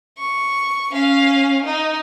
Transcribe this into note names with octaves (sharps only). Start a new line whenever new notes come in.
C#6
C#4 F5
D#4